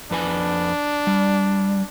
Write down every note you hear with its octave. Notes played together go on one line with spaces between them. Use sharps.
F2 D4 B4 G#5
G3